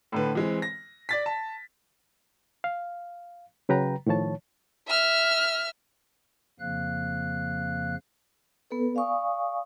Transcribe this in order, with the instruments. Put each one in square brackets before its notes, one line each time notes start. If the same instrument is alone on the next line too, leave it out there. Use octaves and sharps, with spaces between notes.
[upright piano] A2 D3 B4
E3 G#3 C4
A#6
D5 A6 B6
A5
[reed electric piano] F5
C#3 F#3 B4 G5 A#5
A2 D#3 F3 C#5 A5
[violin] E5 F6
[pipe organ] F2 C#3 F3 A#3 F5 F#6
[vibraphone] B3 A4 B4
D5 F5 G#5 C#6 D#6